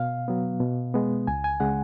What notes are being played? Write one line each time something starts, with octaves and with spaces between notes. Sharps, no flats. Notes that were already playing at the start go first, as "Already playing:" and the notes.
Already playing: B2 F5
F#3 B3
B2
G#3 B3
C#2 G#5
G#5
C#3 G#3 F#5